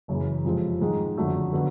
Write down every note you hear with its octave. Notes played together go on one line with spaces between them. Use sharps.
F#1 F#2 C#3 E3
F2 C3 F3 G#3 C4
G#2 D#3 G#3
F#1 F2 D3 F#3 A3
D3 F#3 B3